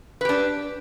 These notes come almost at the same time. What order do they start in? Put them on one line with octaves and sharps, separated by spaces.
B4 G4 D4